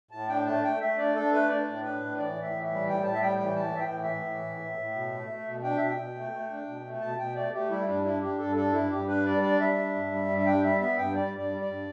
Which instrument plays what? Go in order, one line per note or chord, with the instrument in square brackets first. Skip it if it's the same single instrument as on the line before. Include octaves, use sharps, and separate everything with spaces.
[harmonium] A2 A5
D4 G5
A3 A5
A3 G5
A3 E5
D4 D5
D4 A4
A3 B4
D4 D5
A2
D4 B4
A2
E3 D5
A2
E5
E3
E5
G3
A2 G5
A2 A5
E5
G3 G5
E3 G5
A2 A5
A2 E5
G5
E3
E5
A2
E3
A2
A2
A2
B2
A3
A3
B2
D4 G5
B2 E5
G5
B2
A3
A3
D4
B2
A3
B2 A5
B2 G5
A3 D5
A3 G4
G3 E4
G2 D4
D4 E4
D4 G4
G2 A4
D4 A4
G2 E4
G2 G4
D4 B4
G3 D5
D4 D5
G3 E5
D4
G2
G3
G2
E5
D4 G5
G3 E5
B3 E5
G2 G5
G3 D5
G2
D5
G3
D5
G2